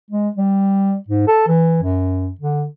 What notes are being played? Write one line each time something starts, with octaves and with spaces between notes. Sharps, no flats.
G#3
G3
G#2
A4
E3
F#2
D3